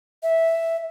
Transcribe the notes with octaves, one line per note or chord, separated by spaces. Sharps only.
E5